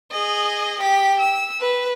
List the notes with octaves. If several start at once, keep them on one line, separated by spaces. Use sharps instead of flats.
G#4 D#5
G4 B6
E6
B4